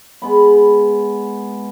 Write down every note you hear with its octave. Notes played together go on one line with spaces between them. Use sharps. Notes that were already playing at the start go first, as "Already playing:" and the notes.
G#3 B3 B5